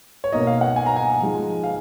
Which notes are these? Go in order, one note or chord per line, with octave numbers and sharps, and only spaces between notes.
C#5
B2 A#3 D#4 D#5
F5
F#5
G#5
A#5
G#5
F3 G#3 D#4
F5